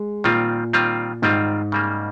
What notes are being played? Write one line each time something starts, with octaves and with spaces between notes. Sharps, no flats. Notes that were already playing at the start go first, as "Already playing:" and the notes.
Already playing: G#3
A#2 D#3 G3 C4 F4
D#3 G3 C4 F4
G#2 D#3 G3 C4 F4
C#3 G3 A#3